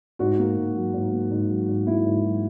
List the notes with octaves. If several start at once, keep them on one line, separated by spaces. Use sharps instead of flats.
G#2 F#4
A#3
G#2
F#3
G#2
A#3
G#2
F#3
G#2
A#3 E4
G#2
F#3